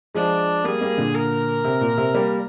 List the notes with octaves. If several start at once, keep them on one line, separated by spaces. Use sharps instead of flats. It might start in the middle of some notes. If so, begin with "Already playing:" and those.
F3 G#3 D4
G3 A#3 G#4
G3 A#3
A#2 D3
A#4
C3
A#2
C3
G3 A#3